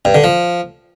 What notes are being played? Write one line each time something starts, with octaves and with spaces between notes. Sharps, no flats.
G2
D3
F3